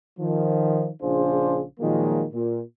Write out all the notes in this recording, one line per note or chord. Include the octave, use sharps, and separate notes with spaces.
D#3 F3
A#1 C#3 D4 F4 G#4 C5
A#2 D#3 F3 F#3 G#3 A#3
A#2